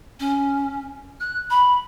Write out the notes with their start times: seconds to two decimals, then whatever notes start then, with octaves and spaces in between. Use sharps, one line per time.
0.20 C#4
1.20 F#6
1.50 B5